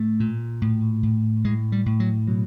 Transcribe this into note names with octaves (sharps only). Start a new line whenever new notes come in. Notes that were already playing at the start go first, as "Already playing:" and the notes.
Already playing: A2 A3
A#2
A2
A2
A2 G#3
G3
A2
F#3
B2 F#3